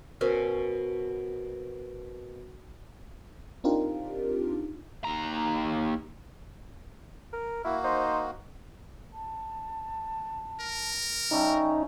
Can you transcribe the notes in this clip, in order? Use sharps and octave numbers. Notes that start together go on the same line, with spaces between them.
B2 C#4 A#4 C5 E5
C4 D4 D#4 F4 G4 A#4
D#2 A#5
A#4
A#3 E4 F#4
D#4 C5
A5
A#4
C#3 G3 A3 D#4 G5